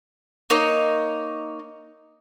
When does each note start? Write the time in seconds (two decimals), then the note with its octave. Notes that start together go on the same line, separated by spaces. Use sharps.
0.50 A#3 D#4 C#5 D#5